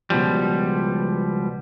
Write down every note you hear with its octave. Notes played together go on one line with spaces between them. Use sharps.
C#2 B2 D#3 F3 G3